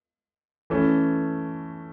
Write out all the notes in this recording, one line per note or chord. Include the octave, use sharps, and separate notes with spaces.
E3 A3 C#4